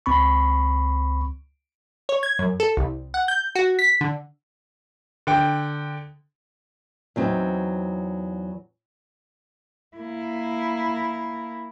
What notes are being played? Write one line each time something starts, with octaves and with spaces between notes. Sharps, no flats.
C#2 C4 B5 C#6
C#5
G#6
F#2
A4
C2
F#5
G6
F#4
B6
D3
D3 G5
E2 F#3 C4 D#4
A#3 E4